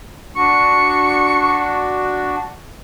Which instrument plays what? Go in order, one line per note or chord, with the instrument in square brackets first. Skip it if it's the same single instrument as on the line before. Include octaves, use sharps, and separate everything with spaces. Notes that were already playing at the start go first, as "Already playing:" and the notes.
[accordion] D4 F#4 [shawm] C#6